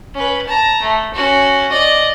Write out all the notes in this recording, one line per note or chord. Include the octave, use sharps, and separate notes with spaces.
C#4 B4
A5 A#5
A3
C#4 F#4
D5 D#5